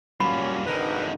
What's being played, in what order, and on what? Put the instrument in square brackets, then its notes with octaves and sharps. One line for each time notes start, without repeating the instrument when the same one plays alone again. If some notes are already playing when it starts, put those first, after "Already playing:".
[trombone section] F#3 A#3 C#4 [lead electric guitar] G3 F4 [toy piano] B5
[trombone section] G#1 [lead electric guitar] D3 D#4 [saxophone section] D4 A#4 B4